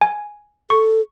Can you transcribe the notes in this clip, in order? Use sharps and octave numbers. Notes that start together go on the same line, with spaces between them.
G#5
A4 C#6